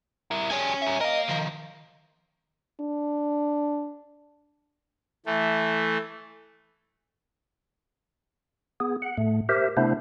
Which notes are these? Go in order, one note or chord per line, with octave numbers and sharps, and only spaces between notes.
E4 A#4
G3 G#4 C#5 G#5
A#4 E5
A#4 D#5 F5
D#3 F3
D4
E3 A3
B3 G#4
F#5
A2 A3
G4 A#4 C5 E5
C3 A3 B3 D4 E4 C5